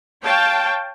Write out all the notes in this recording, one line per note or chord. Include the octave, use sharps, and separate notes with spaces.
C#5 F5 G5 A5